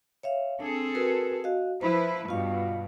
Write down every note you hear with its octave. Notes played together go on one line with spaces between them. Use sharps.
C#5 E5 F5
C4 D4 G#4 A4
F#4 A#4 B4
F#4 D#5 F5
F3 E4 B4 C5
G2 B2 F4 F5